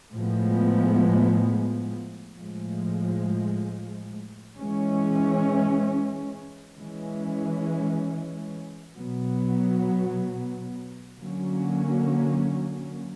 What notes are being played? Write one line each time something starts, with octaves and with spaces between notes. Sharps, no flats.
A2 F3 G#3 B3
A2 F3 G#3
E3 G#3 C#4
E3 G#3 C#4
B2 F#3 B3
D3 F#3 A#3 C#4